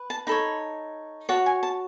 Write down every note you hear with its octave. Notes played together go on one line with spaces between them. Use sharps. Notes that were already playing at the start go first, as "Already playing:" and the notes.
Already playing: B4
A5
D#4 A4 C#5 B5
F#4 C#5 A5
G#5
A5